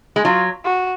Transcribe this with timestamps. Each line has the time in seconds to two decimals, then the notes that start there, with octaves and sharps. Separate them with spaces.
0.16 G#3
0.24 F#3 F4
0.65 F#4